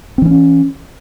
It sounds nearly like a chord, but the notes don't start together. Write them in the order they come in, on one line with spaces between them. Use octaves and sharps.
C4 E3 C#4